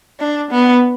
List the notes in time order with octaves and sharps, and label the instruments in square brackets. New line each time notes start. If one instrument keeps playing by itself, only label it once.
[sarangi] D4
B3